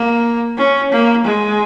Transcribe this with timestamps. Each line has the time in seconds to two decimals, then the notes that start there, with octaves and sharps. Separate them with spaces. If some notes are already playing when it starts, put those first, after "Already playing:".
Already playing: A#3
0.58 C#4
0.92 A#3
1.25 G#3